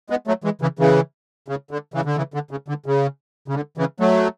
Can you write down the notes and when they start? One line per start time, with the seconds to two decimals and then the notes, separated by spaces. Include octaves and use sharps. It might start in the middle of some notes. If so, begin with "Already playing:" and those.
0.10 G#3 B3
0.27 F#3 A3
0.44 E3 G#3
0.62 C#3 E3
0.79 C#3 E3
1.48 C#3
1.71 D3
1.94 C#3 E3
2.05 D3
2.17 C#3 E3
2.34 D3
2.51 C#3
2.68 D3
2.86 C#3
3.48 C#3
3.54 D3
3.78 C#3 E3
4.00 F#3 A3